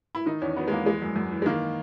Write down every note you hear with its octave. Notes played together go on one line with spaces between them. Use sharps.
E4
D#3 D#4
E2 C#4
F#3 B3
G#3
E2 A#3
E3 G#3
F#2
F#2
E3
G#3
D#3 A#3